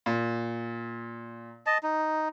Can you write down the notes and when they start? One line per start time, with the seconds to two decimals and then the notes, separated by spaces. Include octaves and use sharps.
0.06 A#2
1.66 D#5 A5
1.83 D#4